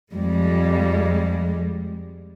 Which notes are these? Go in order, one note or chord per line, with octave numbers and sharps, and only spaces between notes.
F2 G3 G#3